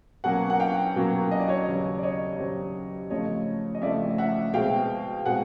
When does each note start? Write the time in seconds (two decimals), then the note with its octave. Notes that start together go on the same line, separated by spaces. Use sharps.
0.24 B2 F#3 A#3 C#4 F#5 G#5
0.50 F#5
0.60 F5 G5
0.96 B2 F#3 A#3 C#4
1.31 D#5
1.40 D5
1.48 C#5 D#5
1.67 D#2 C#3 F#3
1.99 D5
2.03 C#5 D#5
2.38 D#2 C#3 F#3 C5 D5
3.10 C#3 F3 A3 C4 C#5 D#5
3.75 D#5
3.82 C#3 F3 A3 C4 D5 E5
4.18 E5 F#5
4.54 B2 G#3 C4 F5 G5
5.26 B2 G#3 C4 F#5 G#5